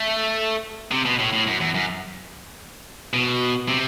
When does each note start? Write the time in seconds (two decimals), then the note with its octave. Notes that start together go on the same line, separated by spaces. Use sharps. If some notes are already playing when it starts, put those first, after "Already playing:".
Already playing: A3
0.92 C3
1.05 B2
1.19 A2
1.33 A2
1.47 F#2
1.60 E2
1.75 F#2
3.14 B2
3.68 C3